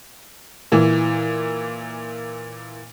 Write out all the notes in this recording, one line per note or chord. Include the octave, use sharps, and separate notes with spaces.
A#2 E3